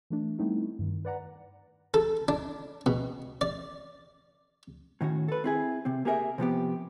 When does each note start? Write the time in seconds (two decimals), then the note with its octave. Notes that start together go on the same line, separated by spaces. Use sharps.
0.10 E3 A3 D4
0.38 G3 A3 B3 C4 D#4 E4
0.79 G2 D#3
1.05 B4 D5 F#5 A#5
1.94 A4
2.28 D4
2.86 B2
3.41 D5
5.01 A2 D#3 C#4 F#4
5.28 A4 B4
5.44 C4 E4 G#4
5.85 C3 C4
6.05 A#3 G4 G#4 A#4 E5
6.38 C3 F3 B3 G4